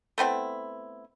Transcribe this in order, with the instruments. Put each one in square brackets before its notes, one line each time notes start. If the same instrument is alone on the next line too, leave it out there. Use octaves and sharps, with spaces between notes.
[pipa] A3 B3 C4 E4